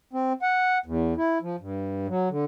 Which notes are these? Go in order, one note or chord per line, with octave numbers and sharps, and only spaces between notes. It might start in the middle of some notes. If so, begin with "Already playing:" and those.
C4
F#5
E2
E4
F3
G2
F#3
D3